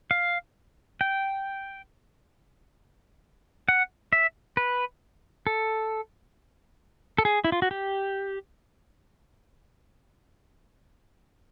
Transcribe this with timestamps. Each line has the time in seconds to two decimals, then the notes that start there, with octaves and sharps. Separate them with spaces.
0.11 F5
1.01 G5
3.68 F#5
4.13 E5
4.57 B4
5.47 A4
7.18 A4
7.25 G#4
7.44 E4
7.52 F4
7.62 F#4
7.71 G4